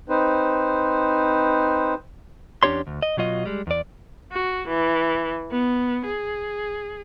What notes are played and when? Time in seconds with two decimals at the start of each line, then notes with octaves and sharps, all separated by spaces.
0.09 C4 D#4 B4 C5
2.63 E2 C#4 D4 G4 C#5 C6
2.87 D2
3.02 D#5
3.17 B2 F#3 F4 D#5
3.45 G3 G#3
3.67 E2 D5
4.32 F#4
4.68 E3
5.51 B3
6.06 G#4